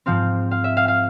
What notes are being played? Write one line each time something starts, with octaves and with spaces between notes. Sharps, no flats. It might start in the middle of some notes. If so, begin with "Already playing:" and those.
G#2 F3 C4 F5
F5
E5
F5
F5